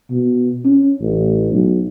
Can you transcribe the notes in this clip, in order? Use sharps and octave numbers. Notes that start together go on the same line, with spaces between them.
B2
C#4
A1
B1